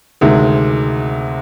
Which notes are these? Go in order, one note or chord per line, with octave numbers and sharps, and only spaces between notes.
D2 C3 D#3 G#3